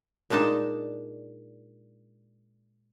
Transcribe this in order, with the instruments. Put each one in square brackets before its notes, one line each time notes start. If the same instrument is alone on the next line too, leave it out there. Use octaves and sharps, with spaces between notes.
[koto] A#2 G#3 D4 D#4 A5